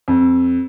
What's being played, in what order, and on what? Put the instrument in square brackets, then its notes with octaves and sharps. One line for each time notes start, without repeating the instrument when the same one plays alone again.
[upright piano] F2